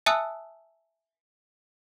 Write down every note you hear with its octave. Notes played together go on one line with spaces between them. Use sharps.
E5 G#5 A5 D#6 E6 F#6